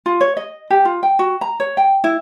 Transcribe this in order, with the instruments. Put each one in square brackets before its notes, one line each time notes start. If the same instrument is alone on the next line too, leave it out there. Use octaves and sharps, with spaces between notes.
[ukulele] F4
C#5
D#5
G4
F4
G5
F#4
A#5
C#5
G5
E4